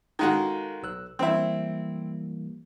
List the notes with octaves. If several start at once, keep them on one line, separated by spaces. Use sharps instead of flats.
D#3 G#3 F#4 A4 A#4 F5
B1 E6 F#6
E3 G3 A#3 C4 E4